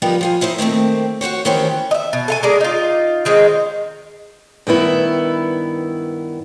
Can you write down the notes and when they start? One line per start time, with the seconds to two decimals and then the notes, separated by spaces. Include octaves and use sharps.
0.02 F3 G3 B3 D#4 G4 A#4
0.21 F3 F4 G#5
0.41 D#4 E4 C5 D#5
0.58 D#3 A3 A#3 C4
1.21 F#4 G4 C5 C#5
1.45 D#3 E3 B3 C#4 G4 C5
1.91 D#5 E5
2.13 B2
2.28 A4 F5 G#5
2.43 G#3 G#4 A#4 D5
2.60 D#4 F4
3.25 D#3 G#3 C4 C#4
4.67 G2 D#3 B3 E4